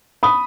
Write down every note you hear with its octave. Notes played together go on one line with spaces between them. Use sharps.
B5 D#6